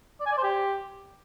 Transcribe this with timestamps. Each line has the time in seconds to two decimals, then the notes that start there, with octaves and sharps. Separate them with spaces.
0.20 D5
0.26 G#5
0.32 D5
0.37 C5
0.43 G4